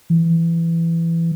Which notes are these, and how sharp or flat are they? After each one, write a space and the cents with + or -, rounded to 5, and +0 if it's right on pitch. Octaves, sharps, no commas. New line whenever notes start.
E3 +15